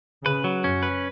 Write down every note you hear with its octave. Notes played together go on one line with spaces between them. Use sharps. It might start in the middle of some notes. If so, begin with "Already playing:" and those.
C#3 B4
F#3
F#2 C#4
B4